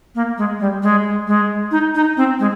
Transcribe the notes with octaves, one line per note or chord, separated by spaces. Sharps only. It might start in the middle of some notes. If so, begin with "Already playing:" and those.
A#3
G#3
G3
G#3
G#3
D#4
D#4
C4
G#3